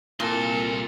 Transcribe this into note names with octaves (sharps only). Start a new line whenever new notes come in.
C2 A#2 C4 E4 A4 A#4 C6